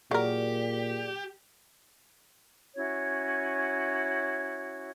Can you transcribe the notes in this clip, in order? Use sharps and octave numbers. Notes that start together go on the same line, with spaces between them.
A#2 F#3 G4 G#4 A#4 D5
C#4 E4 F#4 C#5